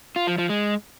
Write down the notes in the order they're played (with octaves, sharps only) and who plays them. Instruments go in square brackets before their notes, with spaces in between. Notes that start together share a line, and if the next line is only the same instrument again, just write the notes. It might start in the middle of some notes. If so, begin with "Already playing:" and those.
[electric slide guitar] F4
F3
F3
G#3